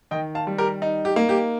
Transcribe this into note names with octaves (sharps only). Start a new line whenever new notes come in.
D#3 D#5 G5
F5 A5
G3
G4 A#4
D#4
G4
A#3
G4